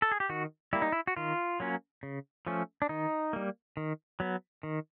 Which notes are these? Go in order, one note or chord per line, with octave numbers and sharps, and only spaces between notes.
A4
G#4
G4
D#3 F#4
G3 A#3 E4
D#4
E4
F#4
D#3 F4
F#3 A#3 C#4
C#3
F3 A3 C#4
D4
D#3 D#4
G3 A#3
D#3
F#3 B3
D#3